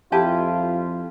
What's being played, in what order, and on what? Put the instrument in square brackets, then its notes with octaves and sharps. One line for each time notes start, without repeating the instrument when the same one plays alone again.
[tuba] F2 [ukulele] E4 G4 A5 [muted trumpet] F4